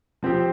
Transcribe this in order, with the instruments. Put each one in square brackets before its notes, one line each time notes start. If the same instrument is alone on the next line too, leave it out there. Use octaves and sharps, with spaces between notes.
[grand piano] F3 C4 G4